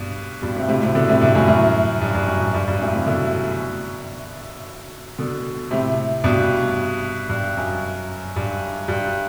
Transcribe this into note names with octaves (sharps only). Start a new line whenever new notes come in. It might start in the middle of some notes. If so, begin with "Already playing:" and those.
Already playing: G2 B2
G2 B2
A2 C3
A2 C3
A2 C3
B2 D3
A2 C3
G2
F#2 A2
F#2 A2
G2
G2
F#2
G2
G2
G2
F#2 A2
A2 C3
B2 D3
B2 D3
A2 C3
G2 B2
G2
F#2
G2
G2